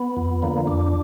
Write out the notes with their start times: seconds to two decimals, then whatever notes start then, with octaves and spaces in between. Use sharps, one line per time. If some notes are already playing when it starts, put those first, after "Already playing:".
Already playing: B3
0.17 F2
0.42 D3 F3 A#3
0.67 F2 D4